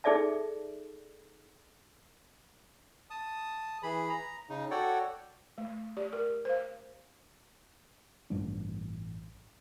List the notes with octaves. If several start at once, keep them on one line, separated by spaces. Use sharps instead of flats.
D#4 G#4 A4 D5 E5 A5
A5 D#6
E3 G#4 B5
A#5
C#3 D#4
F#4 A4 C#5 D5 F#5 G5
A3
G4 D5
A#4
C5 F5
A1 G2 G3 D4